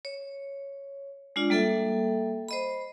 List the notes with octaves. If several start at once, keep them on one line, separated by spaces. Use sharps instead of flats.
C#5
G#3 D4 F4 D5
G3 A#3 A4 E5 G5
C5 D#5 B5